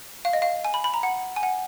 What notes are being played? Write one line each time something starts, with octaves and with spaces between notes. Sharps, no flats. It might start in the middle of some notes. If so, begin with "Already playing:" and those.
F5
D#5
F5
G#5
B5
B5
A#5
F#5
G#5
F#5